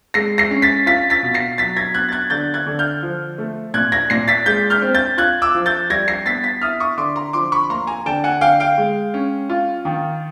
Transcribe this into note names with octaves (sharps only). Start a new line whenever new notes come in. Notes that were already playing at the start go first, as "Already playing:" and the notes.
G#3 A#6 C7
A#6 C7
C#4
A6 B6
F4 A6 B6
A6 B6
B2
A#6 C7
F#3 A6 B6
G#6 A#6
B3 F#6 G#6
A6
F#6 G#6
D3 G6 A6
F#6 G#6
D3
F6 G6
F3
A3
A#2 F#6 G#6
G#6 A#6
A#2 A#6 C7
A6 B6
G#3 G6 A6
F6 G6
C4
G6 A6
F4 F#6 G#6
D6 E6
F3
G6 A6
G3 G#6 A#6
A#6 C7
B3 A6 B6
A6 B6
E4 D#6 F6
C#6 D#6
D3 C6 D6
A#5 C6
F3 C6 D6
B5 C#6
A#3 A#5 C6
G#5 A#5
D3 G5 A5
F#5 G#5
D3 F5 G5
F5 G5
G#3
C#4
F4
D#3